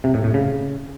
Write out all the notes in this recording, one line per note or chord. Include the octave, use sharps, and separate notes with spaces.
C3
A2
A2
C#3